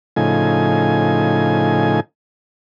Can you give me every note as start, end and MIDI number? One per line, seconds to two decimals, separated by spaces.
0.16 2.00 45
0.16 2.00 49
0.16 2.00 53
0.16 2.00 63
0.16 2.00 80